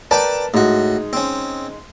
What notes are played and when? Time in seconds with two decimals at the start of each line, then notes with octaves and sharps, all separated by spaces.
0.11 A#4 B4 D5 G5 A5 D6
0.54 A2 G#3 D#4 F#4
1.13 C4 C#4